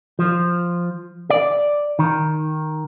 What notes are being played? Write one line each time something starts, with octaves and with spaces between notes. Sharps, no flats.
F3
D5
D#3